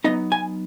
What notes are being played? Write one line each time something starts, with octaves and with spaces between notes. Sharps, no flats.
F#3 B3 D#4 D#5
G#5